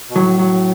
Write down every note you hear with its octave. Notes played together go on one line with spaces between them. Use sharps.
B2
A2 F#3
F#3